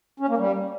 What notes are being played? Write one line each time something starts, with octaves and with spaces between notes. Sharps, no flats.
C#4
A#3
G3